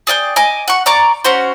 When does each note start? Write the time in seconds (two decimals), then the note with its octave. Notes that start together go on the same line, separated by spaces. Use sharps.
0.07 G#4 D5 F#5 G5
0.36 D#5 G#5 D6
0.68 F#5 C#6
0.86 D5 A#5 C#6 D6
1.24 C#4 F#4 C5